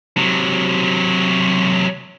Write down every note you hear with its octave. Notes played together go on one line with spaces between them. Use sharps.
C3 F#3